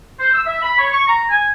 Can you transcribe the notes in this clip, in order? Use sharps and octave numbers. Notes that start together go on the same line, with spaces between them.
C5
E6
E5
B5
C#5
C#6
A#5
G#5